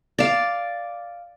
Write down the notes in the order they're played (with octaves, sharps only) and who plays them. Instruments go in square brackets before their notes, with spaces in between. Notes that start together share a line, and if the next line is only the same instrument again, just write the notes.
[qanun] D5 F5